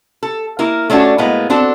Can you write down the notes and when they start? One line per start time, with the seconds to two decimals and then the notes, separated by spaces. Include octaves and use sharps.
0.23 A4
0.59 A#3 E4 A#4
0.90 A3 C#4 D4 F4 F#4
1.18 A2 G#3 A#3 B3
1.50 C4 D4 F#4 A4